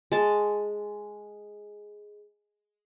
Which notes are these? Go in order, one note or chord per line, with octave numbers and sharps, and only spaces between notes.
G#3 A5